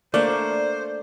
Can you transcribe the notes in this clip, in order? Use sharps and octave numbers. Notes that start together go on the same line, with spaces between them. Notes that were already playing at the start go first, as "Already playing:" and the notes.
A3 A#3 D4 C5 D5